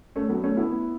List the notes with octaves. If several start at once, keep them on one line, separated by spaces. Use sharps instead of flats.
A3 C#4
F#3 B3
A3 C#4
B3 E4